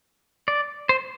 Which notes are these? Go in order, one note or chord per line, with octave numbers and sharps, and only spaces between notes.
D5
C5